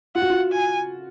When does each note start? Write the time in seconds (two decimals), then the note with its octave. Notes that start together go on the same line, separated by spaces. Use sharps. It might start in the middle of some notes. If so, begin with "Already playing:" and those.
0.15 F4 F#5
0.22 F#4
0.30 F4
0.52 G#5